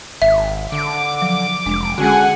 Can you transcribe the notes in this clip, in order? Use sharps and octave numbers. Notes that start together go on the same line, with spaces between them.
G#1 E5
D3 D6
F3 F#3
F1 G#3 D4
D3 G#3 C#4 F#4 G#4 F#5 G#5